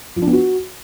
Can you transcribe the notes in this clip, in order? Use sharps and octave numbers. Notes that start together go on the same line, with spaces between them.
F3
D4
B3
F#4